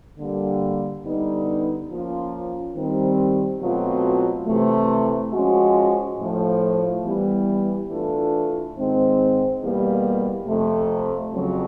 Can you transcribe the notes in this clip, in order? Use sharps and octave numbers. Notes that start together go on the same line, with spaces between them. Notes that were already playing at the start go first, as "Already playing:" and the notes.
D3 G3 A#3
D3 G3 B3 D#4
F3 A#3 C#4 F4
D#3 G3 C4
B2 F#3 A3 C4 F4
C3 E3 A3
F3 G#3 C#4 F#4
A2 F3 A3
E3 G3 B3
E3 A3 D4 F4 A4
G#2 D#3 G#3 C4
E2 B2 G3 A#3
F2 C3 F3 A3
F2 C#3 F#3